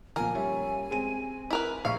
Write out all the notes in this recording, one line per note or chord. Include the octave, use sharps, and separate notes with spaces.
A#2 F3 A#4 G#5
G3 C#4 E5
G#3 C4 D#7
E4 A#4 B4
A#1 E5 F5 C#6